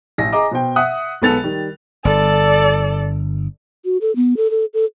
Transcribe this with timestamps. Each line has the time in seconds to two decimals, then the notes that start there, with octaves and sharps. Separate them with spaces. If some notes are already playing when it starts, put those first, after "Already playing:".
0.18 A1 A#6
0.33 G#4 D#5 A#5 D6
0.51 B2 C5 G5
0.76 E5 F#5 D#6 F#6
1.22 B1 G#3 B3 A4 A6 F7
1.44 D#3 G3
2.05 G1 A4 D5
3.85 F#4
4.01 A4
4.16 B3
4.37 A4
4.51 A4
4.74 A4